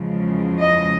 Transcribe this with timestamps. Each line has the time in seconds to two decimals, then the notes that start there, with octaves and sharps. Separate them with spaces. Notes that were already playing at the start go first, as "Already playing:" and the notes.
Already playing: E2 C#3 F3 G#3
0.61 D#5